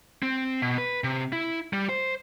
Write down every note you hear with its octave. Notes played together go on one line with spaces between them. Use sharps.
C4
B2
B4
C3
E4
G3
C5